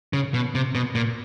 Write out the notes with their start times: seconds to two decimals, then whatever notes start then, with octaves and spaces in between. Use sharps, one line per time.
0.13 C#3
0.34 B2
0.55 C3
0.75 B2
0.95 A#2